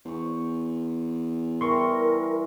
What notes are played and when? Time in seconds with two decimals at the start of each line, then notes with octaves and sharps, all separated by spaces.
0.05 E2 C5 C#6
1.61 E3 G3 E4 A#4 C6 C#6